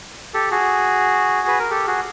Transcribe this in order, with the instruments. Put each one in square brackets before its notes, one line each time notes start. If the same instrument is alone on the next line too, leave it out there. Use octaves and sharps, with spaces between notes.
[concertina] G4 A4
F#4 G#4
B4
A#4
G4 A4
F#4 G#4